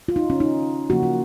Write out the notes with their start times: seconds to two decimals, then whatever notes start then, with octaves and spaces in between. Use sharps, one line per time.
0.08 F4
0.16 D#4
0.30 C#4
0.40 D#4
0.89 C#3 F3 A#3 F#4
1.03 F4